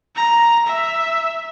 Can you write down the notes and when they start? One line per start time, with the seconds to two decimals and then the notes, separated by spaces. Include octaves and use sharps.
0.16 A#5
0.66 E5